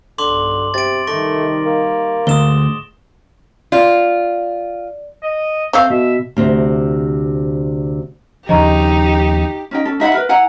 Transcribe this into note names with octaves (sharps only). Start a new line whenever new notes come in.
B1 G2 D3 C6 D6 F#7
C3 A6 D7
C3 D#3 G3 A3 C#6 A#6
A#3
D2 A2 G#3 D#6 E7 G7
F4 D5
D#5
A3 C4 F5 G6 C7
B2 E5
D2 C3
D#2 C#3 F3 D#4 G4 D#5 A#5 C#6
C#4 D#4 G5
C#4 A4
D#4 E5 F#5 B5
A#4 B4
E4 F#5 G#5 A#5